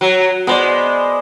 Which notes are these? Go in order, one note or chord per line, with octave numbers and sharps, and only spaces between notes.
F#3
G#3 B3 C5 D5